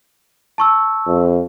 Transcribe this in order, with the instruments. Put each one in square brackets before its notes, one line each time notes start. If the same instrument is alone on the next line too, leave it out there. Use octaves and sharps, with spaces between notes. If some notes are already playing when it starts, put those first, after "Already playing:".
[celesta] A5 C#6 E6
[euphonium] F2